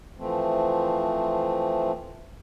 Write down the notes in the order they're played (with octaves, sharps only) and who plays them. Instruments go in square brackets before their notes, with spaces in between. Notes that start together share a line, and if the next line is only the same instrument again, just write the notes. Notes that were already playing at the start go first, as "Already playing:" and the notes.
[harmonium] E3 F3 A3 C4